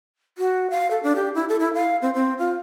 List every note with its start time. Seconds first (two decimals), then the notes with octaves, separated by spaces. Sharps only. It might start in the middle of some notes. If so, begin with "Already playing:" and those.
0.38 F#4
0.70 F5
0.91 A4
1.03 D4
1.16 G4
1.35 E4
1.49 A4
1.60 E4
1.74 F5
2.02 C4
2.14 C4
2.38 F4